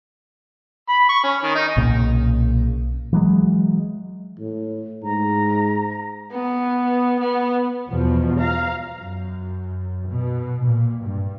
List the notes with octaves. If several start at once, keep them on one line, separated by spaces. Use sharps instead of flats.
B5
C#6
C#4
D#3
D#4
B1 A#2 C#3
E3 F#3 G#3
A2
G#2 A#5
B3
B3
E2 B2 F3
F5 A#5
F#2
B2
A#2
G2